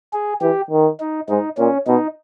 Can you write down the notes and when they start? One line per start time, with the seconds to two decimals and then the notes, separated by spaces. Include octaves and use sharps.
0.13 G#4
0.41 E3 G4
0.71 D#3
1.00 D#4
1.29 G#2 D#4
1.57 A#2 C#4
1.87 B2 D#4